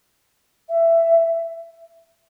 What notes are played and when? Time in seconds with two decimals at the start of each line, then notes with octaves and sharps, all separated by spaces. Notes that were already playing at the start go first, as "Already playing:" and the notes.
0.69 E5